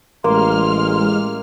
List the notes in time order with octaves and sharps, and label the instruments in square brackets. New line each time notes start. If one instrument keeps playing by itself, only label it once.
[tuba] A1 [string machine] G#3 F6 [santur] A#3 [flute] C6